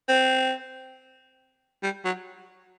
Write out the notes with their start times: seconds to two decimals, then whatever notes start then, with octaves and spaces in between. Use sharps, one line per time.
0.09 C4
1.83 G3
2.05 F#3